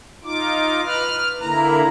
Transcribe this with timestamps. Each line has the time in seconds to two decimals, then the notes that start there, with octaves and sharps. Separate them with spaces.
0.24 D#4 F4 D6
0.85 B4 F6
1.41 D3 A#3 E4 A#5